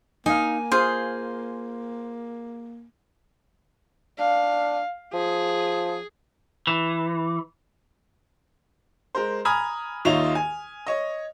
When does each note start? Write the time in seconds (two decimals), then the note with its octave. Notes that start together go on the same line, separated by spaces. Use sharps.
0.26 A#3 D#4 F5 G#5
0.72 F4 G#4 C5
4.19 D4 F5
5.13 F3 G#4
6.67 E3
9.15 G#3 A#4 C5
9.45 G#5 A#5 B5 D#6 F6 G#6
10.05 D#2 D#4 F4 C#5 E5 F7
10.35 G#5
10.87 C#5 D#5